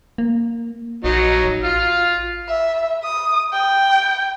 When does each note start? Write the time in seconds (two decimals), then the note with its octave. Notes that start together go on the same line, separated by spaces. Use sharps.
0.18 A#3
1.04 A#1 F#3 D#4
1.44 A1
1.64 F4 F6
2.48 E5
3.04 D#6
3.53 G5